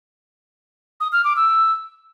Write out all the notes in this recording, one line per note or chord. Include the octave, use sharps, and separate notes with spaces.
D#6
F6
D6
E6